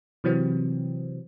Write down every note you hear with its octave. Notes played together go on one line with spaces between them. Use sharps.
C3 E3 F#3 C4